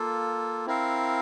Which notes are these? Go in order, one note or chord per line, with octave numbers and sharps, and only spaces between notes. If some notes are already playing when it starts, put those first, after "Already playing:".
Already playing: A#3 F4 A4
C4 E4 A#4 F5